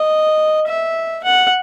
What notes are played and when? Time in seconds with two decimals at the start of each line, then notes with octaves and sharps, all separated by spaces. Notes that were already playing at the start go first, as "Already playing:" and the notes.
Already playing: D#5
0.67 E5
1.24 F#5